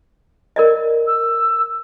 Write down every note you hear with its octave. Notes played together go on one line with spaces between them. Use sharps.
A#4 D5 D#5
E6